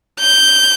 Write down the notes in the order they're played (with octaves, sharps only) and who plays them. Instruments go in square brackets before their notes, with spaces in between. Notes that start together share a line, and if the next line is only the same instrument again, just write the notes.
[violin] G6